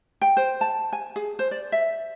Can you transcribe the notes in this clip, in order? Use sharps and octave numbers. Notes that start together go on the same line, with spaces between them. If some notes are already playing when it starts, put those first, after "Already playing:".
G5
C5
A5
G#5
G#4
C5
D5
E5